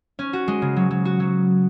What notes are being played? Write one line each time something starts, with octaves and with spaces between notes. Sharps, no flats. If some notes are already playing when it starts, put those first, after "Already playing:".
C#4
F#4
G#3
C#3
F#3
F#3
F#4
F#3